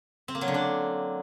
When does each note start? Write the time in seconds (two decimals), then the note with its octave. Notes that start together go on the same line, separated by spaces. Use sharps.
0.28 C4
0.35 A#3
0.41 F#3
0.48 D3
0.54 D4